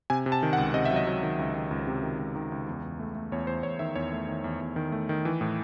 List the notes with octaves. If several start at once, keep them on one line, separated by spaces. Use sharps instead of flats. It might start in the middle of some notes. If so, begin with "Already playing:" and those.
C3 G#5
C3
A5
D#3
F#5
C#2
C3 D#5
E5
F#3
D#5
F#3
D#3
C#2
D#3
C#2
C3
D#3
C#2
D#3
C#2
E2
E2
A3
A3
E2 C#5
E2 C5
E2 C#5
D#3 E5
E2 C#5
A3
D#3
E2
E2
D#3
A3
D#3
E3
A2